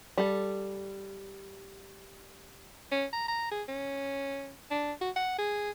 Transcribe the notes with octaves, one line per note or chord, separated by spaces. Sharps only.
G3 A4
C#4
A#5
A#5
G#4
C#4
D4
F#4
F#5
G#4